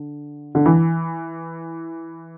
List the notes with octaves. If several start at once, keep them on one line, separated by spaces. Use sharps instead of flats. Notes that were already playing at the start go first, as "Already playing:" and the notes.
Already playing: D3
D3
E3